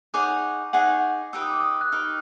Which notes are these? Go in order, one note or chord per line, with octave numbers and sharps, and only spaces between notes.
D#4 G#4 C#5 F#5 D6
D#4 G#4 C#5 F#5
D#4 G4 B4 E6
D#6
D6
D#6
F#6
D#4 G4 B4 F6